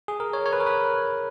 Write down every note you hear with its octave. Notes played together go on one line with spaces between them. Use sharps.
G#4
A#4
C#5
C#5
B4
A#4
B4